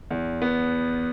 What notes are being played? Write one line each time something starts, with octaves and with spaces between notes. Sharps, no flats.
E2
B3